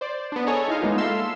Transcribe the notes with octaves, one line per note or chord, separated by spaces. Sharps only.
C5 D5
B3 D4
G#4 A4 C#5 D#5 G#5 A#5
D#4 E4 D#5 F5 C6
G#3 A#3 B3 D#4 F4
A4 E5 F5 C6 E6